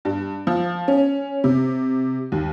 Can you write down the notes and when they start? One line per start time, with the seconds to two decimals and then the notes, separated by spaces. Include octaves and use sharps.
0.05 G2
0.47 F3
0.88 C#4
1.44 C3
2.32 D#2